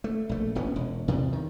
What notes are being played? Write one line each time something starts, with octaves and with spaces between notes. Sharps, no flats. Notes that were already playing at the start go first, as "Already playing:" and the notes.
A3
A#1 A3
E1 A#1 B3 C#4
E1
E2 C3
D#3